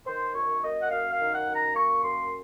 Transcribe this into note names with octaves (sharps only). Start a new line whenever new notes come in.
D#3 C5
F#2 C#5
A#3 D#5
F#5
F#2 F5
F5
D#3
F#5
F#2
A#5
A#3 C#6
F#2 C6